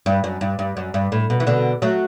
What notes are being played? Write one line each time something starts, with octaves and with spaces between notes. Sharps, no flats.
G2
F#2
G2
G2
F#2
G2
A2
B2
E3
B2 D3
F#3 A3